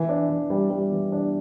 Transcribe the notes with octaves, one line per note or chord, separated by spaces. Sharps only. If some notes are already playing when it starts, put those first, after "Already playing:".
Already playing: E3
D4
E3
G3
G3
E3
D4